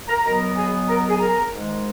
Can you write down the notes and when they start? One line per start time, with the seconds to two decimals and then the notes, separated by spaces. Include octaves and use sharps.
0.09 A#4 A#5
0.24 B2 F#3 B3 A#4 A#5
0.57 G#4 G#5
0.89 A#4 A#5
1.09 G#4 G#5
1.20 A#4 A#5
1.52 G#2 D#3 G#3